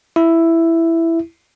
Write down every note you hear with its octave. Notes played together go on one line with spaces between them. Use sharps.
E4